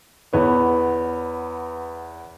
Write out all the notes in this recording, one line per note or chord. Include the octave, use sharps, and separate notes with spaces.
E2 B3 C#5